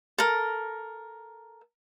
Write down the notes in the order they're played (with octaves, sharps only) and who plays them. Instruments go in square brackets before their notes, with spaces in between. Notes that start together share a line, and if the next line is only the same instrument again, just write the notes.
[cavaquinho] A4 A#4